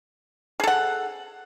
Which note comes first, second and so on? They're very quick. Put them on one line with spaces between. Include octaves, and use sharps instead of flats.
G#4 A4 F#5